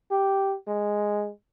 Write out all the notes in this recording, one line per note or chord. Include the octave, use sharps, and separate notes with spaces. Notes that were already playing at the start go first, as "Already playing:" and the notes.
G4
G#3